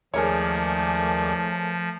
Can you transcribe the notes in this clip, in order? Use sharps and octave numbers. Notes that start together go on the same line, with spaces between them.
D#2 F3 G#3 A3 G#4 A#4 C#5 D5